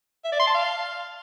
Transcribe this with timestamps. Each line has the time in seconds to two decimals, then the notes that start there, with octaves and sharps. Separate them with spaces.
0.25 E5
0.32 D5
0.40 C6
0.47 A5
0.55 F5